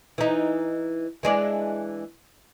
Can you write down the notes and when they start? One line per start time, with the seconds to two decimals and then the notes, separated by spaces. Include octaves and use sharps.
0.18 E3 D#4
1.23 E3 G#3 D4